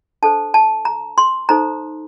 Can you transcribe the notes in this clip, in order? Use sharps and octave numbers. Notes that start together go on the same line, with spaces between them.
D4 A4 C5 A5
A5
A#5
C6
D#4 A4 C5 A#5